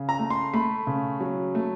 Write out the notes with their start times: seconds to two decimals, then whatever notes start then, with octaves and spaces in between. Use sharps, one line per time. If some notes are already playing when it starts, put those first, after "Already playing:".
Already playing: C#3
0.09 A#5
0.19 A3
0.30 C6
0.53 A3 B5
0.87 C#3
1.20 F#3
1.55 A3